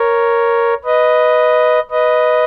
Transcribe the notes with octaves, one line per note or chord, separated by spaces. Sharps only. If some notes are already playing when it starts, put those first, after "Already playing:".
Already playing: A#4 C#5
B4 D#5
B4 D#5